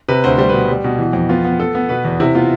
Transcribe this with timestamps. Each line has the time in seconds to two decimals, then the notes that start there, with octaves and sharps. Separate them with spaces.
0.08 C3 B4
0.24 D2 C5
0.38 G3 C5
0.49 B2 B4
0.69 G3
0.84 B2
0.98 E3
1.13 F2
1.29 B3 F4
1.45 B3
1.59 B3 A4
1.75 B3
1.89 B2 B4
2.05 E2
2.20 C3 E4
2.35 B3 F4